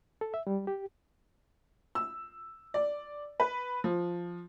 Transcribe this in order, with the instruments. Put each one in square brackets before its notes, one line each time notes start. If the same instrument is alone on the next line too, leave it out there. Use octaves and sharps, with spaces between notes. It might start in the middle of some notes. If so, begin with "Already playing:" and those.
[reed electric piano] A4
E5
G3
G4
[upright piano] E6
D5
B4
F3